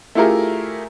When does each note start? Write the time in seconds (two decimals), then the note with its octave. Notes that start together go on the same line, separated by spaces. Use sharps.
0.15 A3 E4 F4 G4 G#4 A#4